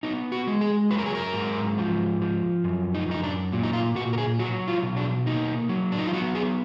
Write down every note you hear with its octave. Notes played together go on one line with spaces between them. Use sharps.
B3 D#4
F#4
G#3
G#4
F#3 B4
A#4
G#4
A#4
G#2
F3
F3
F#2
D#4
F#2 D#4
D4
A#2
D#4
F4
A#2 F#4
A#4
G#4
F#3 F#4
F4
B2
D4
A#3 D#4
F#3
D4
D#4
F4
B3 F#4
G#4